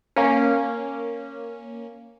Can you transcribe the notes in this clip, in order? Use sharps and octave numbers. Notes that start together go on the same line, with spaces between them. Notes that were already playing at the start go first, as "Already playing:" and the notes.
A#3 C#4